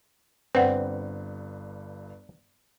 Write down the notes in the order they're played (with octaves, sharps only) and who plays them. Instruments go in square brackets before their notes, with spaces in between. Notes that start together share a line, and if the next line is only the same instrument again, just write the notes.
[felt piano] G1 G2 [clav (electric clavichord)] C4 [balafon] B4 D5 F#5